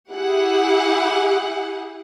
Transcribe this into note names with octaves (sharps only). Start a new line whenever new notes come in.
E4 G4 G#4 F#5